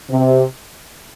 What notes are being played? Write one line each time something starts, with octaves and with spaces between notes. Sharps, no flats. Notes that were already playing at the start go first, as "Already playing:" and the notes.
C3